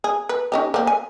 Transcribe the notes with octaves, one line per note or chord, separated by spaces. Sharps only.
G#4
B4
C#4 D#4 G4
A#3 C4
G#5